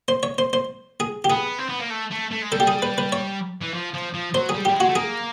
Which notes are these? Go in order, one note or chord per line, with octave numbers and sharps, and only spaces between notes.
C5
C#5
C5
C5
G#4
G4
B3 G#4
C4
B3
A#3
A3
A3
A3
G#3
G3 A4
G4
G#4
B4
B4
C#5
E3
F3
F3
F3
F#3 C5
G#4
G3
G3 G4
G#3
F#4
A3
A#3 G#4